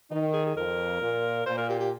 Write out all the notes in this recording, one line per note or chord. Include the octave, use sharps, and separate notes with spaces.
D#3 D#4
G#4
G#4
F2 A#4
A#2
A#2 C5
A#4
G4
G4